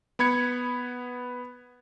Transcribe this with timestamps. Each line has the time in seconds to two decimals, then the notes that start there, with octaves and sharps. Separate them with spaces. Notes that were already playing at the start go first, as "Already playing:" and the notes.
0.19 B3 B5 G#6 C#7